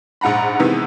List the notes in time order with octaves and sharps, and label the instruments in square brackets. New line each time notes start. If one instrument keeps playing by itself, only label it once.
[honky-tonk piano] A#1 G#2 F#5 A#5 B5
C3 D#3 E3 G#3 B3